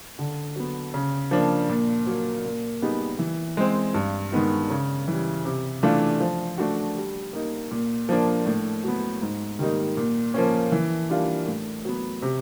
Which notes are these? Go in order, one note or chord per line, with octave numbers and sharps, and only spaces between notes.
D3
F#3 B3
C#3
F3 A#3 D4
A#2
F#3 A#3
A#2
G3 B3 D#4 G#4
E3
G#3 C4
G2
D#3 G#3 B3 D#4
C#3
E3 G3
C3
E3 A3 D4 F4
F3
A3 D4 F#4
G3
A#3 D#4
A#2
F3 A#3 D4
A2
F#3 B3
G#2
D#3 G3 A#3 D#4
A#2
F3 A#3 C#4
E3
G3 A#3 D4 F4
A2
F#3 B3
C3